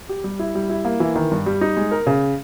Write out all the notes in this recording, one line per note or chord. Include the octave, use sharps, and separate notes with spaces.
G4
G3
E4
G3
E4
A#3
E3
D#3
G2
G3
D#4
G#3
A#4
C#3